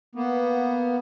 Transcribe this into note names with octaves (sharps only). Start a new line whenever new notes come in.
A#3 B3